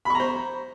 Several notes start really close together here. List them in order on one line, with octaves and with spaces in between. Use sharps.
B5 C#6 A#5 C5